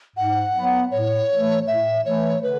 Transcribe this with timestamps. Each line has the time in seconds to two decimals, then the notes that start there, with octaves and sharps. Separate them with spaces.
0.17 G#2 F#5
0.54 F#3 B3
0.91 A2 C#5
1.30 E3 A3
1.67 A2 E5
2.06 E3 A3 C#5
2.43 D3 B4